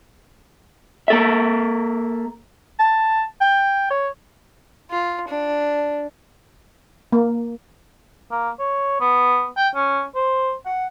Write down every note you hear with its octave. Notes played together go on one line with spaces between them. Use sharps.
A#3 A4 E5
A5
G5
C#5
F4
D4
A#3
A#3
C#5
B3
G5
C#4
C5
F#5